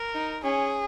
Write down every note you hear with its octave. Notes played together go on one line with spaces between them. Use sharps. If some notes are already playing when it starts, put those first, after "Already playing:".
Already playing: A#4
D#4
C#4 G#4